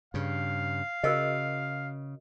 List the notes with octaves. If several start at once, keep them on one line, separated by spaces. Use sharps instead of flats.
G2 C#3 F5
C#3 F#4 A#4 D#5